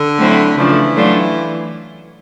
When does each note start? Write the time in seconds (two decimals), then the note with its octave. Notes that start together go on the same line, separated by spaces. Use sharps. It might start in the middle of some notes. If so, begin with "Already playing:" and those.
Already playing: D3
0.19 F#3 A3 C4 E4
0.58 C#3 E3 F3 A3 D4
0.96 F#3 A3 D4 F4